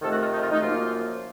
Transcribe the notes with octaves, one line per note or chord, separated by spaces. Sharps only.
F2 C3 D#3 A3 A4
F#4
F4
D#4
F4
D#4
F#2 F3 A#3 F4